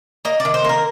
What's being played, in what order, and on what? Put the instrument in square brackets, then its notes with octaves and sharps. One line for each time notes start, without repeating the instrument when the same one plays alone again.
[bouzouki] A#3 D#5
D5
D#3
C5
A#3 A#4